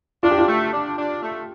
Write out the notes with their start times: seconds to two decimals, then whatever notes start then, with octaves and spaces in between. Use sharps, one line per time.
0.23 D4 F4
0.31 G4
0.38 F4
0.48 A3
0.73 D4
0.98 D4
1.22 A3